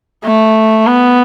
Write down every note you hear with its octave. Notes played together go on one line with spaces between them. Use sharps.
A3
B3